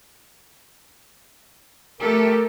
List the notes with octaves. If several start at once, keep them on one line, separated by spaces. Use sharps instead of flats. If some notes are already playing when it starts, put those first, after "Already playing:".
A3 G4 A4 A#4